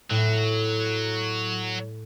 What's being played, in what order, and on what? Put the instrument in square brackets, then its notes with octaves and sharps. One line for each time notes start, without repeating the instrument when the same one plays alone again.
[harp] A2 [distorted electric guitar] F#3